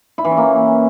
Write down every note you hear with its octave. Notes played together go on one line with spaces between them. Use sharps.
E4
E3
C#4
A#3